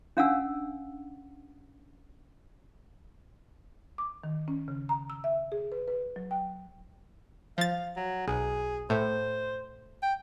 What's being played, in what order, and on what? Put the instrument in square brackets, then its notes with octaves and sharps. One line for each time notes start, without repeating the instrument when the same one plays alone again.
[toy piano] C#4 D4 F5 F#5 G#5 E6
[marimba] D6
D#3
C#4
C#3
A#5
E6
E5
G#4
B4
B4
F#3
G5
[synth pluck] F3 A6 [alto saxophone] F5
[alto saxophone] F#3
[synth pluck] B1 [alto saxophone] G#4
[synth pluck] A2 [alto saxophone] C5
[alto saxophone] G5